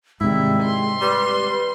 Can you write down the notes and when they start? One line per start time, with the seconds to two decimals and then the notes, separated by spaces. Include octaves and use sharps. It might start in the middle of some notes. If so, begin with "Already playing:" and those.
0.21 G#2 C3 D#3 G3 G#3 E4
0.63 C6
1.01 G3 B4